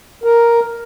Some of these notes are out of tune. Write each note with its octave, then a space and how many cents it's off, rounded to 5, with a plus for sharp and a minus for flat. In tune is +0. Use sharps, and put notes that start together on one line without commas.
A#4 +5